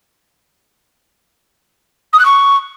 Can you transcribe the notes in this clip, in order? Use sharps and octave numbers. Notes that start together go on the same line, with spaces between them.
D#6
F#6
C#6